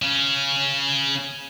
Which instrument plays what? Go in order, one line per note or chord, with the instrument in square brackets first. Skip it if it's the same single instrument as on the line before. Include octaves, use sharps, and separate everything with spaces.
[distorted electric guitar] C#3 C#4